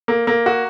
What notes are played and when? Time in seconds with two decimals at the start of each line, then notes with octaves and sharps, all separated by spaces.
0.08 A#3
0.27 A#3
0.46 F#4